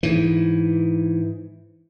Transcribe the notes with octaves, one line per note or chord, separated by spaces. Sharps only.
G#2 E3